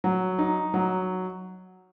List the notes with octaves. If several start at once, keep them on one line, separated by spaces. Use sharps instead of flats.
F#3
D#4
F#3